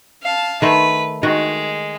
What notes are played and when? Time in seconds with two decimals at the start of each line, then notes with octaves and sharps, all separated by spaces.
0.23 F5 A5
0.62 D#3 A3 B4 C5
1.23 D#3 G#3 F#4